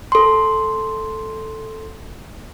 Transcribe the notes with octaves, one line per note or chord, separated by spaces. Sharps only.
A4 C6